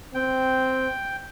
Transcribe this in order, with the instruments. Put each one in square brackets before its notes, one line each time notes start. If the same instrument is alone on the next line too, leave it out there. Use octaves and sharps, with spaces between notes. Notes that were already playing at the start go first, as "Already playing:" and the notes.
[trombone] C4 [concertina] G5